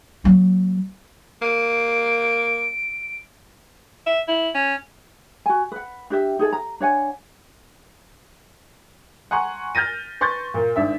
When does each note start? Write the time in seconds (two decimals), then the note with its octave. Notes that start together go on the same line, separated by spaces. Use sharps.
0.24 F#3 A#3
1.42 A#3 D7
4.06 E5
4.28 E4
4.54 C#4
5.46 F#4 G#5
5.72 B4 F#5
6.10 D4 G4 E5
6.39 D#4 G#4 A4
6.53 A#5
6.80 D4 C#5 F#5 G#5
9.31 F#5 G#5 A#5 C6 C#6
9.75 F6 G6 A6 A#6 D#7
10.21 B4 C6 C#6 G6 A6
10.54 A#2 A#3
10.76 G#1 D4 E5